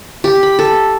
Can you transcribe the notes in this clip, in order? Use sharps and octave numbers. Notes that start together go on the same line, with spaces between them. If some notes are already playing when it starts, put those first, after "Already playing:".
G4
B5
A4